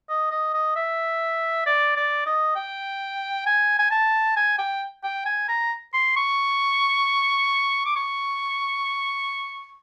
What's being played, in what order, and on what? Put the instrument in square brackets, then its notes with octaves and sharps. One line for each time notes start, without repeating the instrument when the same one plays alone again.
[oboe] D#5
D#5
D#5
E5
D5
D5
D#5
G5
G#5
G#5
A5
G#5
G5
G5
G#5
A#5
C6
C#6
D6
C#6